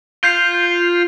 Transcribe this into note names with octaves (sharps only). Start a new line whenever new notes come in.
F4 G6 C7